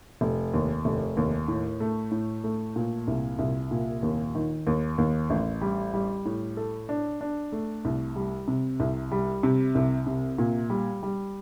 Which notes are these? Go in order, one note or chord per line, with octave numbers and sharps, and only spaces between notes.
F1
D#2
F1
D#2
A2
A3
A2
A3
A#2
C2
C2
A#2
D#2
D#3
D#2
D#2
A1
G3
G3
A2
A4
D4
D4
A3
C2
G3
C3
C2
G3
C3
C2
C3
A#2
G3
G3